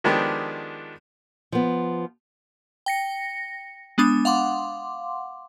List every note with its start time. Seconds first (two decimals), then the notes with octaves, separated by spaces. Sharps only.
0.04 D#3 F3 G#3 B3 D4 G4
1.52 F3 B3
2.86 G5 A#6 C#7
3.98 G#3 B3 D4 D#6
4.25 F5 F#5 C6 D6